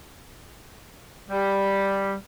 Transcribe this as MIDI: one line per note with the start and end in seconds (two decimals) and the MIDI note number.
1.29 2.14 55